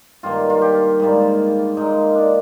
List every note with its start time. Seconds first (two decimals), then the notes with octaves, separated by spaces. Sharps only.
0.23 G2 D#3 A#3 F4
0.50 F4
0.62 G4
1.00 G#2 G3 A#3
1.77 A#2 G#3 D#4
2.15 D4